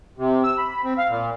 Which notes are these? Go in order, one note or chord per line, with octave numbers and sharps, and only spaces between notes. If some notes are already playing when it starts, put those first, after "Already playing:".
C3
E6
B5
C4
F5
A#2